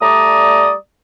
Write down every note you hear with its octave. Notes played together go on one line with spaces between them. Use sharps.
G3 A3 D5 A#5 D#6